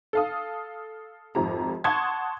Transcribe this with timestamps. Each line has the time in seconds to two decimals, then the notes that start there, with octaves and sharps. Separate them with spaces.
0.13 A4 F5 D#6
1.35 G#1 F2 G4 A#5
1.84 F#5 A5 C6 C#6 D#6 G#6